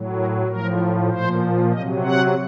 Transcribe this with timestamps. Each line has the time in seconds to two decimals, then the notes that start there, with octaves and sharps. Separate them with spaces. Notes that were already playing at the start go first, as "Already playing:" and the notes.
Already playing: A2 F#3
0.16 A#4
0.47 A2 F3 A#4
1.10 A#2 F3 C5
1.72 C3 F#3 D#5
2.03 F#5